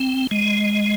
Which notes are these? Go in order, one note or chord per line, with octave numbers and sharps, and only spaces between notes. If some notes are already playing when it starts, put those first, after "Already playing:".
Already playing: C4
G#3